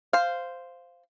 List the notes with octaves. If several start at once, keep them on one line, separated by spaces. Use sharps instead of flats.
C5 F5